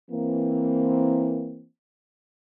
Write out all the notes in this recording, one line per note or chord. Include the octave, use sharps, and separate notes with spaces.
E3 A#3 C4